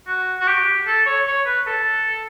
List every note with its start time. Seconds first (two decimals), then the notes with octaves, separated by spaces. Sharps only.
0.07 F#4
0.40 F#4
0.48 G4
0.87 A4
1.06 C#5
1.26 C#5
1.46 B4
1.67 A4